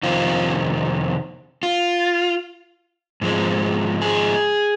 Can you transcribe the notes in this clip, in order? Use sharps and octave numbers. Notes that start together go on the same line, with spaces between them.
F2 C3 D#3 C4 F4
F4
G#2 F3 G#3 C4
G#4